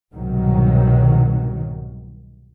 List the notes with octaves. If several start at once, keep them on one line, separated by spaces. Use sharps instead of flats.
C2 G#2 B2 D#3 F#3